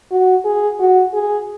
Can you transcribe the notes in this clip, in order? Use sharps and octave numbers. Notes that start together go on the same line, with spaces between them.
F#4
G#4
F#4
G#4